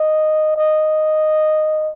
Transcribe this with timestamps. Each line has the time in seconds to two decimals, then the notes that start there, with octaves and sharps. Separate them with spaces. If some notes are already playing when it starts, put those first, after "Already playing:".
Already playing: D#5
0.56 D#5